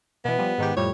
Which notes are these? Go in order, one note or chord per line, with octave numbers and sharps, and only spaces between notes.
B2 E3 B3
F3 G3
G#2 D#3 G4
F2 A2 G3 C#5